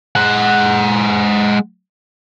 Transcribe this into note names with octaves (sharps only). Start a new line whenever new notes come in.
G#3 F#5